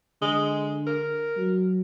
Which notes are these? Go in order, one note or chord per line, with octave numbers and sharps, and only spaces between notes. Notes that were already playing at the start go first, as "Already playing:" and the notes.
D3 G#3
A#4
F#3